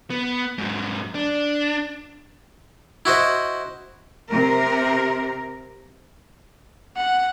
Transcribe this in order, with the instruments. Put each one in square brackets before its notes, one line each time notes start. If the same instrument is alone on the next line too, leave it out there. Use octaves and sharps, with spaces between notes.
[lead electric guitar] B3
G#2 F#3
D4
[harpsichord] E4 F#4 C5 D#5
[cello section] C3 A#4
[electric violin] F#5